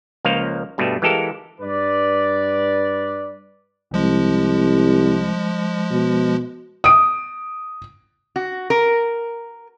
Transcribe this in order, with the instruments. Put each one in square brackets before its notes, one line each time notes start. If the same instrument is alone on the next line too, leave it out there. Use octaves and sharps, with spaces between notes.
[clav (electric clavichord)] C#2 F3 A#3 C#5 F5
G2 B2 G3 A3
E3 G#3 G4 A4 A#4 F5
[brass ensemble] G2 B4 D5
[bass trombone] C2 [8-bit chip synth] F3 G#3
[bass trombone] B2
[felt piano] D#6 D7
[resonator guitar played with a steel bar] F#4
A#4